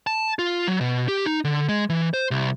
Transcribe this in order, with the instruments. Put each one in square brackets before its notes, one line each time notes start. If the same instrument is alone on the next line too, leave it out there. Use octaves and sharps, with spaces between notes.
[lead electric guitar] A5
F4
F#3
B2
G4
D#4
D3
G#3
E3
C5
C2